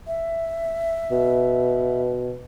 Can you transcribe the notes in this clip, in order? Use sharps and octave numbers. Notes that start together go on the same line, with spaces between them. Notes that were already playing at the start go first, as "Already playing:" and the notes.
E5
B2